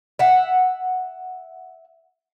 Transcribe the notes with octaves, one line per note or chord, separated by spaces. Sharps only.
E5 F#5